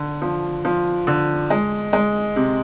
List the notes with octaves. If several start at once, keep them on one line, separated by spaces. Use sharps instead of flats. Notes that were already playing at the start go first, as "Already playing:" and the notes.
Already playing: D3
F3
F3
D3
G#3
G#3
C3